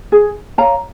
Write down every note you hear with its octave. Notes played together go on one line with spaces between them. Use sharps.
G#4
C#5 F5 A#5